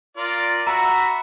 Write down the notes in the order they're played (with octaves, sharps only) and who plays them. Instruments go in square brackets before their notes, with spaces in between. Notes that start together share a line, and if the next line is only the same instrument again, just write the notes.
[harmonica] F4 A#4 D5
[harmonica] F#4 E5 B5 [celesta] A#5